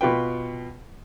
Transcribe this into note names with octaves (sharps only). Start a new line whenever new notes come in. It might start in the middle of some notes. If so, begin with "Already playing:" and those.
B2 F4 B4 G5